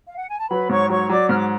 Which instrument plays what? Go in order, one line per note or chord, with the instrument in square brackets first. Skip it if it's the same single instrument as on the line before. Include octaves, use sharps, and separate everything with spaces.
[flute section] F5
F#5
G#5
A5
[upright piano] F#3 [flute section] B4 B5
[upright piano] G#2 [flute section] C#5 C#6
[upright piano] F#3 [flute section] C#5 C#6
[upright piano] F#3 [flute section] D5 D6
[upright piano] G#2 [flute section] F6
[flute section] D6